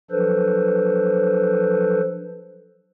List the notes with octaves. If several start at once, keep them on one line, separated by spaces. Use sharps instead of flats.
F3 F#3 D4 A4 B4 C5